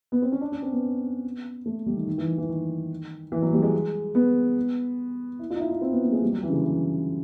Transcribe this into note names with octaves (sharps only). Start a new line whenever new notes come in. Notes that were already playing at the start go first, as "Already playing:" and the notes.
B3
C4
C#4
D4
C#4
C4
B3
A3
G3
D#3
D#3
E3
D#3
E3
D#3
E3
F#3
G3
G#3
B3
E4
F4
D#4
E4
D#4
C4
B3
A#3
G#3
G3
F#3
E3
C#3
D3
E3